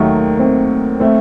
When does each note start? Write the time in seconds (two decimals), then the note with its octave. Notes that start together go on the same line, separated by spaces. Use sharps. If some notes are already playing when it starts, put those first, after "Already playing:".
Already playing: D#2 D#3 F#3 A3 A#3
0.39 A3 C4
1.00 A3 C4